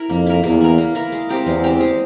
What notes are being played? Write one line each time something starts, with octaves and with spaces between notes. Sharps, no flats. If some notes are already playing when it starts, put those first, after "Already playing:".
Already playing: E4 A#4
F2 A#3
E4 A#4
E2 A#3
E4 A#4
A#3
E4 A#4
G#3
C4 G4 A#4
E2 G#3
C4 G4 A#4
G#3